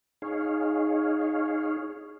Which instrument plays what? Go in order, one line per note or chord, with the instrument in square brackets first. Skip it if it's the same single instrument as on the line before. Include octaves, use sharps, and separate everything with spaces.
[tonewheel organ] D#4 G#4 C#5 F5